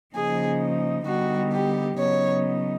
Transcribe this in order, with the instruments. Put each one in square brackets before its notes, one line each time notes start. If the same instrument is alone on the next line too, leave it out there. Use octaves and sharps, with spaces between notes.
[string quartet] C#3 F3 A#3 D#4 G#4
D3 G3 B3 D#4 F#4
G4
C#3 F#3 B3 D#4 C#5